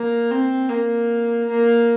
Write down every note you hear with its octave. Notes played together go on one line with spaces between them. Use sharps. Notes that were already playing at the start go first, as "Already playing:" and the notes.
Already playing: A#3
C4
A#3
A#3